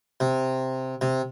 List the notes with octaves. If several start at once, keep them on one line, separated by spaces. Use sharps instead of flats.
C3
C3